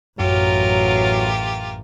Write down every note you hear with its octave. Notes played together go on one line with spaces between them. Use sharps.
A1 F#2 F#3 F4 G4 A#4